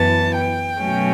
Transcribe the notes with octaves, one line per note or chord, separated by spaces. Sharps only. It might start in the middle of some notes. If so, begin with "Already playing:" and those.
Already playing: F#2 E3 B3 A5
G5
B2 F#3 A3 C#4